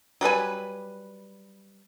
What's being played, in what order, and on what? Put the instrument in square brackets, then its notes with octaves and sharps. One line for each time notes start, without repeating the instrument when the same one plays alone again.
[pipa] F#3 G3 B4 G#5